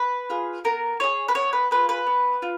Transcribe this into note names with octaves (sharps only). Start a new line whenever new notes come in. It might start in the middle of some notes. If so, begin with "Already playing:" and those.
Already playing: B4
F4 G#4
B3 A#4
F4 G#4 C#5
B4
B3 C#5
B4
F4 G#4 B4
B4
B3
F4